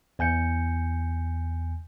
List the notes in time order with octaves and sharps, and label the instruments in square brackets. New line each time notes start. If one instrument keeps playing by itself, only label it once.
[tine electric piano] E2 G#5 G6 C#7